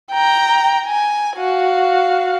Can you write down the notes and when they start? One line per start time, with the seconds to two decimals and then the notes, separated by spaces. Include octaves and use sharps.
0.11 G5 A#5
0.86 G#5
1.37 F#4 F5